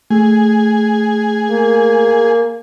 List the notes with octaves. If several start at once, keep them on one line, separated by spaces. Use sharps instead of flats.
A3 G#4
A#3